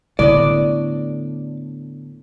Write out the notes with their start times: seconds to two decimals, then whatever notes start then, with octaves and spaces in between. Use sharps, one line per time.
0.19 A2 D3 B3 D4 D5 D#5